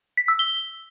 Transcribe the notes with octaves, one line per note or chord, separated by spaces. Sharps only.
B6
E6
G7